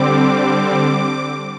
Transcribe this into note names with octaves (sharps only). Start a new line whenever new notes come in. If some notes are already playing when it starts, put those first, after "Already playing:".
Already playing: D3 G3 C4 D6